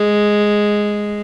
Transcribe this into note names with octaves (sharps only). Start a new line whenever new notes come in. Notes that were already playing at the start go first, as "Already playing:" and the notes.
Already playing: G#3